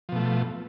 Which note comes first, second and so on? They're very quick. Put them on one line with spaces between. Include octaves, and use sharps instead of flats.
F3 B2 A3